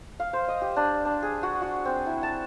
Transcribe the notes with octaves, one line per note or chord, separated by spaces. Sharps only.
F5
C5
D#5
G4
D4
D4
G#4
F#4
F#4
C4
E4
A5